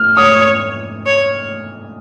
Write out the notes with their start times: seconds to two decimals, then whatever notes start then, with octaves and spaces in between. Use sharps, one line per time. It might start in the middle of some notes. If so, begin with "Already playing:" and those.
Already playing: F6
0.17 C#5 D#6
1.06 C#5